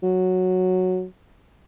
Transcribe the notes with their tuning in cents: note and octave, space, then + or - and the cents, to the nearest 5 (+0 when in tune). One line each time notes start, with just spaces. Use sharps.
F#3 -5